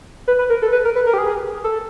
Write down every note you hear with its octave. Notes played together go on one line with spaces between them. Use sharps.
B4
B4
A#4
A4
B4
A#4
B4
A#4
G4
G#4
A4